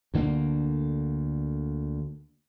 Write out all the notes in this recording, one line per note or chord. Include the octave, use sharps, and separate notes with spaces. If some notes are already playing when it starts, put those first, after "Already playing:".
D2 D3 A3 A#3